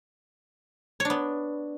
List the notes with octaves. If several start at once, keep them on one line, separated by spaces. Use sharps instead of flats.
B3 D4 C#5